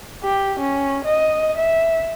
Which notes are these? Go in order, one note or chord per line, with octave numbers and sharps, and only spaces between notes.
G4
C#4
D#5
E5